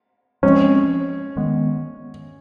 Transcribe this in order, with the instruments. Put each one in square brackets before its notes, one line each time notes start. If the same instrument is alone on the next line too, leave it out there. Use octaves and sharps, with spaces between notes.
[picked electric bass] F3 G#3 C4 [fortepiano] C#4
[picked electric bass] D#3 G#3 B3